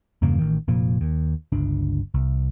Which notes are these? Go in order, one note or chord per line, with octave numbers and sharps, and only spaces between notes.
E2 G2 C#3 A#3
A1 D#3
F1 A#2 F3
D#2
G1 C#2 D4
C2